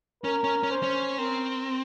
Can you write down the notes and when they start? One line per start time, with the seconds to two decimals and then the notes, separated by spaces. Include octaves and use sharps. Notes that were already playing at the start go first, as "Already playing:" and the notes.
0.23 C#4 A#4
0.44 C#4
0.63 C#4
0.71 C5
0.83 C#4
1.18 C4 A#4